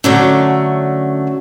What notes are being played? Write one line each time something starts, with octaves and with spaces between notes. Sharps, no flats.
D3 F#3 A3 C#4